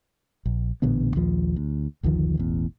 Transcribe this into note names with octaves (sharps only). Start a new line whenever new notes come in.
A#1
A1 A#2 D3 B3
A#1 D#2 F3
D2
F#1 D2 D#3 F3
E1 A1 E2